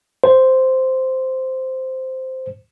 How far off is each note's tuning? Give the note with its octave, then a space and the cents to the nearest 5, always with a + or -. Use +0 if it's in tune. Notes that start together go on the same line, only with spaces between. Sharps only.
C5 -5